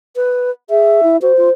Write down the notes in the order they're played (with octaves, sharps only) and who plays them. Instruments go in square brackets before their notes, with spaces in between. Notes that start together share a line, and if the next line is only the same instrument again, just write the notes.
[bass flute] B4
[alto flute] G#4 [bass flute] E5
[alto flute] E4
[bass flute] F#4 [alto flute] C5
[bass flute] F4